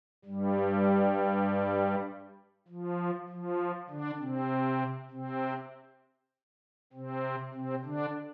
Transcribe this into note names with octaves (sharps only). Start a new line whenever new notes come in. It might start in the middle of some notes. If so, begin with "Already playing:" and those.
G2 G3
F3
F3
D3 D4
C3 C4
C3 C4
C3 C4
C3 C4
D3 D4